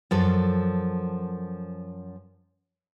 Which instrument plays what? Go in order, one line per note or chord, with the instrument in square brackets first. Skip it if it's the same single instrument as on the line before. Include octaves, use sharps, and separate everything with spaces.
[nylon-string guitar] F#2 F3 A4